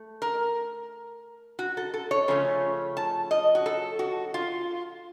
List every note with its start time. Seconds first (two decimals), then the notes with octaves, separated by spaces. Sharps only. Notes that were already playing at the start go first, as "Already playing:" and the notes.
Already playing: A3
0.22 A#4
1.59 F#4
1.77 A4
1.94 A4
2.11 C#5
2.28 C#3 F3 A3 C#4
2.97 A5
3.31 D#5
3.55 F#4
3.66 A4
3.99 F#4
4.34 F4